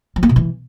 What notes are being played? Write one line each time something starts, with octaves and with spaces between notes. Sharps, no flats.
F3
A#3
B2
E3